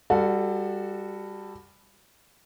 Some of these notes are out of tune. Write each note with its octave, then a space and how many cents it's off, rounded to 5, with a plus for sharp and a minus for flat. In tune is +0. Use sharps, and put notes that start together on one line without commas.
G3 +20 F#4 -5 A4 +10